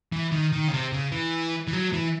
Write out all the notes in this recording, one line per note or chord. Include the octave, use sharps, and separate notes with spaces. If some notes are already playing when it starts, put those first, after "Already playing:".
E3
D#3
D#3
C#3
C3
C#3
E3
E3
F#3
E3